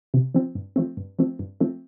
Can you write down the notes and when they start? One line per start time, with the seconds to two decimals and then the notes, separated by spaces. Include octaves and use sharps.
0.14 C3
0.34 F3 C4
0.55 G2
0.76 F3 A3 C4
0.97 G2
1.19 F3 A3 C4
1.39 G2
1.61 F3 A3 C4